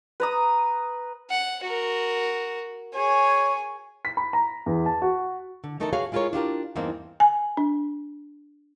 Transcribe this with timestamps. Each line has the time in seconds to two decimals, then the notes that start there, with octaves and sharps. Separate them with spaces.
0.20 B4 A#5 D#6
1.30 F#5
1.63 F#4 A#4
2.94 G#4 C#5 G#5
4.05 B6
4.17 B5
4.33 A#5
4.66 E2
4.86 A5
5.02 F#4
5.64 D3
5.80 E2 A3 D#4 A#4 E5 A5
5.93 F#4 G#4 B4 C#5 F5 G#5
6.12 G#3 E4 F4 G#4 A#4 C#5
6.33 D4 F4 G4 A#4
6.76 E2 G2 A#3 C4 D#4
7.20 G#5
7.57 D4